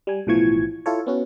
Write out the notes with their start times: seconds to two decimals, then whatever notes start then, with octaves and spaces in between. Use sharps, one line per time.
0.07 G3 G#5
0.27 B1 A2 E3 F3 C#6 G#6
0.86 E4 F4 A4 C#5
1.07 B3 C#4 F#4